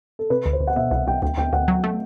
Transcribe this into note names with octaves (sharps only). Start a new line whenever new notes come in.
A4
C3 B4
D2
C5
D2
F#5
B2 E5
C2 F#5
C2 G5
D2 G5
D2 G5
D2 F#5
F#3
A3